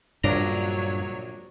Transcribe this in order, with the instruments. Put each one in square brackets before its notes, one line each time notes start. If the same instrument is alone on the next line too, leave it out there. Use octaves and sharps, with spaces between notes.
[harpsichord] A#1 D4 A#5 [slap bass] G2 A#2 C#3 [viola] F#3 C#5